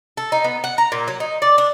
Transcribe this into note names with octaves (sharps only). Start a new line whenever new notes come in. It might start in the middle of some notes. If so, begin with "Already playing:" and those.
A4
D#4
B3
F#5
A#5
A#2
F#3
D#4
D5
D4